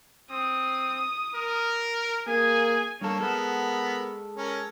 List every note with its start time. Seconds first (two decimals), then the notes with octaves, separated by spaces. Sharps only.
0.30 C4 D#6
1.35 A#4
2.28 A#3 G#4 G#5
3.01 G2 A#3 A4 C#5
3.20 G#3 B3 A4 A#4 F#5
4.37 C#4 A#4